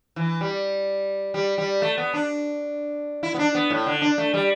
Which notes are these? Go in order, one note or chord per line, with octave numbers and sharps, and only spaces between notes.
E3
G3
G3
G3
A3
B3
D4
E4
B3
D4
B3
A2
D3
D4
A3
G3